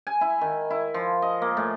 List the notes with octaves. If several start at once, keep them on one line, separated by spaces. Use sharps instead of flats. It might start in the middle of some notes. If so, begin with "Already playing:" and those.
G#5
E4
D#3
E4
F3
D#5
A#3
A2